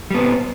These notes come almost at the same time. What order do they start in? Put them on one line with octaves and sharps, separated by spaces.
G3 B3 C4